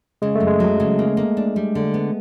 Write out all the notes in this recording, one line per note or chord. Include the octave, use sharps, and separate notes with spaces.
C#3 G#3
A3
F#2
G#3
F#3
C#3
A#3
A#3
D4
G3
D3
B3